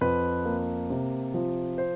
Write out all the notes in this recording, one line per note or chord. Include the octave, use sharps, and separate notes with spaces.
F2 B4
A#3
C3
F3
C5